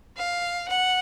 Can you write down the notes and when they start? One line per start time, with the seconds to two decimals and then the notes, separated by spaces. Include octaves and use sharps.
0.17 F5
0.68 F#5